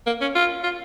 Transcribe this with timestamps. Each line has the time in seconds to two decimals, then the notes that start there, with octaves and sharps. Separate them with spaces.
0.07 A#3
0.21 C#4
0.35 F4
0.64 F4